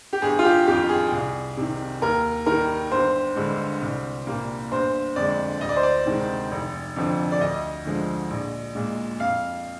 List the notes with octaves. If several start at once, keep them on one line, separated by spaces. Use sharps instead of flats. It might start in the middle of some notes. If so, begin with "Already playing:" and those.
G4
G1 G#4
F4
G4
F2 D#3 G4
G#4
C2
C3 D#3
D#2 A#4
D#3 G3 A#4
G1 C5
G2 D3 G#3
C2
A#2 G3 A#3
G1 C5
F2 D3 G#3 D5
D2 D#5
D5
C5
D5
C3 D#3 G#3
F1
F2 D3 F3
D5
D2 D#5
D3 F3 G#3
A#1
A#2 G#3
F2 F5